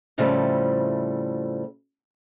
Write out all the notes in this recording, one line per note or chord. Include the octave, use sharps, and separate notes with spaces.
F2 A2 C#3 F3 G3 A3